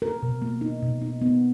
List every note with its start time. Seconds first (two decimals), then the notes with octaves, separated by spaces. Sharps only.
0.02 A#4
0.22 B2
0.42 A#3
0.61 D#4
0.82 B2
1.02 D#4
1.21 B3